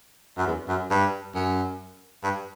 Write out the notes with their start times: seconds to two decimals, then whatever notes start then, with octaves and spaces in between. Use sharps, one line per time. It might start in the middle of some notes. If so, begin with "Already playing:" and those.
0.37 F#2
0.46 E2
0.68 F#2
0.90 G2
1.35 F#2
2.23 G2